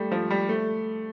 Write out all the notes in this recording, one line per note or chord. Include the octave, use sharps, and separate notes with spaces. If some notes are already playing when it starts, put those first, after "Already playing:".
Already playing: G3 A3
F3
G3
A3